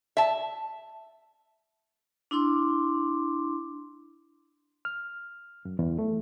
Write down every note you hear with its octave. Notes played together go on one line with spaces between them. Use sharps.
E5 A5
D4 E4 C6 D6
F6
F#2
E2
A3